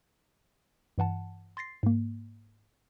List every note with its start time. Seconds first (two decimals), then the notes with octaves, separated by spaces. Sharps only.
0.98 G2 E3 F#5 A5
1.57 C6 A6 A#6 C7
1.83 G#2 A#3